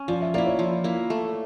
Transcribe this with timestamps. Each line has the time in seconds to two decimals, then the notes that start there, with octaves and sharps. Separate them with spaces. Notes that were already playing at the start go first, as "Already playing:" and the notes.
Already playing: C#4
0.08 F3 D5
0.22 E5
0.34 A#3 D5
0.38 E4
0.47 C#5
0.59 F3
0.84 A#3 E4
1.10 A3